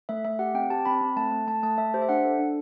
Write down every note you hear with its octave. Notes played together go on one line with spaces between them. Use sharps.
A3 E5
A3 E5
G4 F#5
C4 G5
G4 A5
C4 B5
C4
A3 A5
A3
A3 A5
A3 A5
A3 E5
G4 C5
E5
D4 F#5
A4
D4